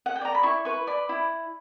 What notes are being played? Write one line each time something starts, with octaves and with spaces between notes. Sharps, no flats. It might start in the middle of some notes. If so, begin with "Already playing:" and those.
F#5
G5
D5 A#5
B5
E4 C#6
B4 C#6
D5 B5
E4